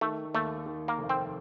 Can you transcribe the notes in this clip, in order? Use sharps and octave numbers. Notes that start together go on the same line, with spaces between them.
D#3 A3
D#2 A3
D#3
A#3
F1
C4